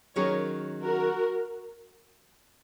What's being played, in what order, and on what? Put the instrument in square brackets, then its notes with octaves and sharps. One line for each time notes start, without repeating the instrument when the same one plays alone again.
[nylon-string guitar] D#3 F#3 C#4 G#4 [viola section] A#4 C#5
[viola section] F#4 A#4